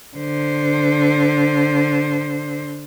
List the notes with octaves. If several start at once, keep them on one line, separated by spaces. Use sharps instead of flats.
D3 C5